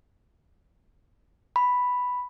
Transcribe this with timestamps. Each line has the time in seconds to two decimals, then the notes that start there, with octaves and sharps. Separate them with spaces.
1.56 B5